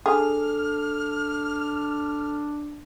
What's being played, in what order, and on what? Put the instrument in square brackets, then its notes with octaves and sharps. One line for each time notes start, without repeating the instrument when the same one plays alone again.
[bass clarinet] D4 [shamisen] G#4 [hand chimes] A4 [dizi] F6